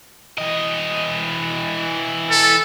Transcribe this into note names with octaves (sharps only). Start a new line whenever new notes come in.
E3 D#5
A4